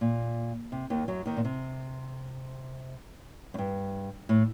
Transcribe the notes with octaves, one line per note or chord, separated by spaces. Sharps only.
A#2
C3
D#2 D#3
F#2 F#3
D#2 D#3
A#2
C3
F#2
G2
A2